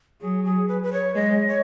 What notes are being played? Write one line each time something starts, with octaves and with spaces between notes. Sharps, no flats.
F#3 G#4
G#4
B4
B4
C#5
G#3 D#5
C#5